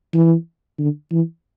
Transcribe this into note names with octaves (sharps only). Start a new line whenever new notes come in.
E3
D3
E3